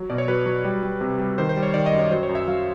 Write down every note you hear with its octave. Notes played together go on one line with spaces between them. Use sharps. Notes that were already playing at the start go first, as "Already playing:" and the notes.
Already playing: F#3
B2 D5
C#5
F#3 B4
F#3
G3
G3
C3
G3
D#3 C5
C5
G3
C#5
D#3 D5
D#5
F#2
C#5
F#3 C5
C#5
F#2
E5
F#3 F5